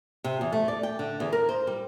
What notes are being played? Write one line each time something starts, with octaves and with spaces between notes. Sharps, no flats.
C3
E2
A3
D5
G5
D3
E2
A#4
C5
G3